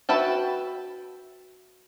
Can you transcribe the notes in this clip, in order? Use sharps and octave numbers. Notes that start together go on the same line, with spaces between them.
F#4 B4 E5 G5 A5